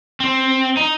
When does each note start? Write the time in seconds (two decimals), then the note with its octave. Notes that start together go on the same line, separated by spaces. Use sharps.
0.20 C4
0.77 D#4